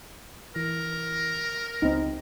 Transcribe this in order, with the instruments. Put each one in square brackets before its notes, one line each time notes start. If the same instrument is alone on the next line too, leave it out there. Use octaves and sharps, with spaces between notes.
[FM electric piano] E3 [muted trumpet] A#4
[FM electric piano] C#2 [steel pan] C4 D#4